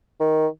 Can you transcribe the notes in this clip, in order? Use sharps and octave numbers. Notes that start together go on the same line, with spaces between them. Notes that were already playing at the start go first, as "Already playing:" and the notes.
D#3